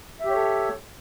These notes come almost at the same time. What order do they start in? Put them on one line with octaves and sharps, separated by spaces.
E5 G4 C#5 A4